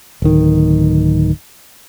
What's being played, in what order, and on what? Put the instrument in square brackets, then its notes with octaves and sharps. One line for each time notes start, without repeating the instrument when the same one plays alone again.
[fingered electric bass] D1 D#3